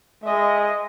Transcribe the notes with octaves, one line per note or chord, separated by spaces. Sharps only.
G#3 D#5 E5